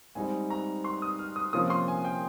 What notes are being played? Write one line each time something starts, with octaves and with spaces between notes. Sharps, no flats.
G#2 G3 C4 D#4 G#5
A#5
C6
D#6
F6
D#6
C3 F3 A#3 C#4 F4 D#6
C6
G#5
G5